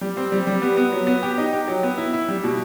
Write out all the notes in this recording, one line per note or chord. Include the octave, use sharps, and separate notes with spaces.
G3
C4
G3
G3
B3
B3
F#3
B3
G4
D#4
G4
F#3
B3
E4
E4
G3
B2